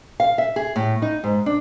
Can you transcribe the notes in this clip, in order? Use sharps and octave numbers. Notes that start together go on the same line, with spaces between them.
F5
E5
G#4
A2
D#4
G#2
D4